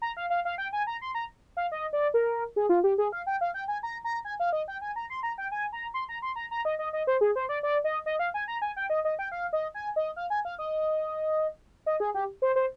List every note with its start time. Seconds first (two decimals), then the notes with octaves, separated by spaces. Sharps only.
0.02 A#5
0.17 F5
0.30 F5
0.45 F5
0.58 G5
0.73 G#5
0.87 A#5
1.01 C6
1.15 A#5
1.57 F5
1.72 D#5
1.93 D5
2.14 A#4
2.56 G#4
2.69 F4
2.84 G4
2.98 G#4
3.12 F5
3.27 G5
3.41 F5
3.54 G5
3.68 G#5
3.83 A#5
4.04 A#5
4.25 G#5
4.40 F5
4.53 D#5
4.68 G5
4.82 G#5
4.96 A#5
5.10 C6
5.23 A#5
5.38 G5
5.52 G#5
5.73 A#5
5.94 C6
6.09 A#5
6.22 C6
6.36 A#5
6.51 A#5
6.65 D#5
6.79 D#5
6.93 D#5
7.07 C5
7.21 G#4
7.36 C5
7.49 D5
7.63 D5
7.84 D#5
8.06 D#5
8.19 F5
8.34 G#5
8.48 A#5
8.62 G#5
8.76 G5
8.90 D#5
9.05 D#5
9.19 G5
9.32 F5
9.53 D#5
9.74 G#5
9.96 D#5
10.16 F5
10.30 G#5
10.45 F5
10.59 D#5
11.86 D#5
12.00 G#4
12.14 G4
12.42 C5
12.56 C5